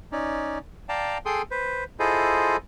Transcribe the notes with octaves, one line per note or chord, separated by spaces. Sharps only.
C#4 D#4 D5
D5 F5 G5 A5 A#5
G#4 A4 G5 C6 D#6
B4 C5
E4 F4 G#4 A4 C5 D#5